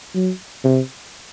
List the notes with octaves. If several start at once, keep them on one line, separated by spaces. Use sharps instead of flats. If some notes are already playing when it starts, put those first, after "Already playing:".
F#3
C3